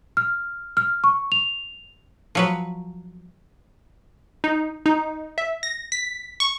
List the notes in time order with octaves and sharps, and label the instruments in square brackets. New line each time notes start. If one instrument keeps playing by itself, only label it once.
[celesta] F6
F6
C#6
F7
[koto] F3 F#3 B4
[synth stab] D#4
D#4
E5
A#6
B6
C#6